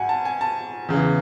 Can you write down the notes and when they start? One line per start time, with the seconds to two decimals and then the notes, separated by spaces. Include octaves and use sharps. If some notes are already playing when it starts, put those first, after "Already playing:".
Already playing: G#2 F#3 F#5 G#5
0.09 A5
0.25 G#5
0.41 A5
0.89 E2 C#3 E3